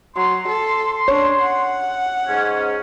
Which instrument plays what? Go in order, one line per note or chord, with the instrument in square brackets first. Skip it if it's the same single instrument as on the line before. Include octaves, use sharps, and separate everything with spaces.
[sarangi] F#3 [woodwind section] C6
[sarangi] A4
[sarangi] D4 [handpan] C#5
[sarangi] F#5
[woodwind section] G#2 C#4